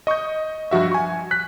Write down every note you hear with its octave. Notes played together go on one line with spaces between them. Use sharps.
D#5 C#6 D#6 G6
G2 F3 F#4 E5
G#5 C#6
F#6 B6